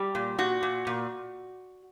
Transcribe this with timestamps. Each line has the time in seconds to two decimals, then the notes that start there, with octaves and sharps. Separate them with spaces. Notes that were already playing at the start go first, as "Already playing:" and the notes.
Already playing: G3 G4
0.15 A#2
0.38 A#2 F#4
0.63 A#2
0.87 A#2